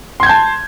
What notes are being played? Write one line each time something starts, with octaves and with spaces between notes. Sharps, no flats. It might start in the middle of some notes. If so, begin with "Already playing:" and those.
A5 C6 G6 G#6